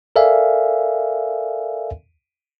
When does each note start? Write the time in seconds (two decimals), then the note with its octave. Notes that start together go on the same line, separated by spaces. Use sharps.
0.16 A4 A#4 D5 E5 F5 G#5